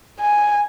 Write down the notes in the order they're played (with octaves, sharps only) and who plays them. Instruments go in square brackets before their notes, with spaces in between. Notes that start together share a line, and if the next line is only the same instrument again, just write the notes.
[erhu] G#5